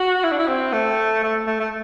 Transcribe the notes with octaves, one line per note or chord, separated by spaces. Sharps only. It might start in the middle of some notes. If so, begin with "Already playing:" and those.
Already playing: F#4
E4
D4
E4
C4
A3
A3
A3
A3